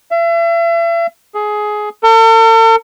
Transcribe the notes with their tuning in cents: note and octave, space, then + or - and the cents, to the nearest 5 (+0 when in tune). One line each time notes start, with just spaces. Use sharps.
E5 +40
G#4 +15
A4 +45